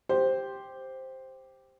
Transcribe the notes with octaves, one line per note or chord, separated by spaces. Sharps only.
G4 C5